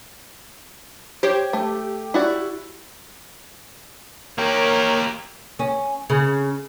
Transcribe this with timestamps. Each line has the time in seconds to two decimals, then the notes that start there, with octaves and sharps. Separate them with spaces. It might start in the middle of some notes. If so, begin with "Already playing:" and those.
1.23 G4 C5 C#5
1.53 A3
2.14 E4 F#4 D5
4.38 A#3 G4 A#4 C#5
5.59 C#4
6.10 C#3